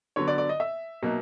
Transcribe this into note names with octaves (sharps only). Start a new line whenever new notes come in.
D3 F#3 B3 C#5
D5
D5
D#5
E5
B2 F#3 A#3 D#4